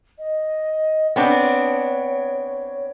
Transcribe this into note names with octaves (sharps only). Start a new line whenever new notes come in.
D#5
B3 C4 D4 C#5